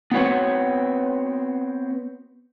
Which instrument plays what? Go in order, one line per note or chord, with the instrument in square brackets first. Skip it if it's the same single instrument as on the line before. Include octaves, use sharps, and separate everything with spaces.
[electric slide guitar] B3 C4 F#4 B4 C#5 F#5